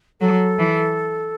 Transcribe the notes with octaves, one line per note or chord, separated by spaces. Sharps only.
F#3 A4
E3